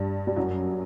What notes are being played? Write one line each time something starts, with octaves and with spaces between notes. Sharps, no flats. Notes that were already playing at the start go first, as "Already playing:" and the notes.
Already playing: G2
G3
F#2 F#3